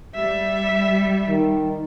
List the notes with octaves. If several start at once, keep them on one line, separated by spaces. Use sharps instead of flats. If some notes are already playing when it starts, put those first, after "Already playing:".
G3 E5
D#3